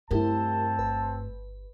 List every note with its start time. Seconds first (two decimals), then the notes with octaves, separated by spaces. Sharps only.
0.11 G2 A3 C4 E4 G4 A#4 A5
0.79 G1 B4